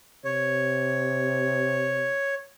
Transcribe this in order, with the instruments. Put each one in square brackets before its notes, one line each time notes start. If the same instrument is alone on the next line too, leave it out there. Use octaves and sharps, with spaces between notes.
[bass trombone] C3 [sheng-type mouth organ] C#5